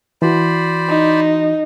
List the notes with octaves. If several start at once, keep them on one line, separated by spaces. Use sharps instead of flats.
E3 F#4 C5 D5 B5
D#4